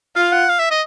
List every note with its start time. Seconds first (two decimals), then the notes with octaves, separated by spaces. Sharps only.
0.16 F4 F5
0.32 F#5
0.49 F5
0.59 E5
0.71 D#5